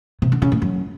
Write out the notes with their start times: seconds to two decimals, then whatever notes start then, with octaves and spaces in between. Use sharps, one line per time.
0.22 C3
0.32 D3
0.42 C#3
0.52 A2
0.62 F#2